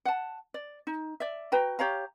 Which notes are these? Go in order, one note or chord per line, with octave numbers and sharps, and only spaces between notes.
F#5 A5
D5
D#4
D5 E5
F#4 B4 G5 A#5
G4 C#5 F5 A#5